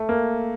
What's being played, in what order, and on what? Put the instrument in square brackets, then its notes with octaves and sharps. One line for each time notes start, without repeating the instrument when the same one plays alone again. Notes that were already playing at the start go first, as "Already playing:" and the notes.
Already playing: [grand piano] A3
A#3